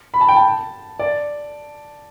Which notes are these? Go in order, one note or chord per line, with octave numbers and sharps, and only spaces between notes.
B5
A5
G5
A5
D5